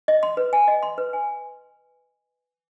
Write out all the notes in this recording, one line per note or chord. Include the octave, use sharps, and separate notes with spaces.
D#5
C6
B4
G#5
D#5
C6
B4
G#5